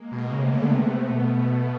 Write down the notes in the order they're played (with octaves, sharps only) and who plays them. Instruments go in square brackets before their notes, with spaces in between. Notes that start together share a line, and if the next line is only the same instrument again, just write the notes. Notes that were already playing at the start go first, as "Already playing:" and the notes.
Already playing: [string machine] G#3 A#3
[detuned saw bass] B2
[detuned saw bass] C#3 [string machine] A3 B3
[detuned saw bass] C3
C#3
D3
[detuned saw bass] C3 [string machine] A3 B3
[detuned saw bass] B2